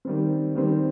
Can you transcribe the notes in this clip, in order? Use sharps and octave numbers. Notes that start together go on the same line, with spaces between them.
D#3 G3 C4
D#3 G3 C4